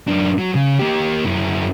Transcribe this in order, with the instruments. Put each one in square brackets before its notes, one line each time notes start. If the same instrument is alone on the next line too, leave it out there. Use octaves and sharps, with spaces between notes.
[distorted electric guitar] F#2 D4
F#3
C#3
A#3 G4
F#2 E4